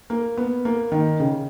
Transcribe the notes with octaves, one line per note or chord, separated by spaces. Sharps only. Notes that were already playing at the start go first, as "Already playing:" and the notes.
A#3
B3
A#3
D#3
C#3